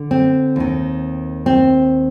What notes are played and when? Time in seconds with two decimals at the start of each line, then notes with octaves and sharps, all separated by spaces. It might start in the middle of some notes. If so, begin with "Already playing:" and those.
Already playing: D3
0.11 C4
0.56 D#2 D#3
1.46 C4